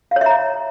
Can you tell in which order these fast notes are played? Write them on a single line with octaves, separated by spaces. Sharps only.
F5 C#5 E5 A#5